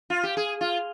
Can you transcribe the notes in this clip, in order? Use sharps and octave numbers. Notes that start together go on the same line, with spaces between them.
F4
G4
G#4
F4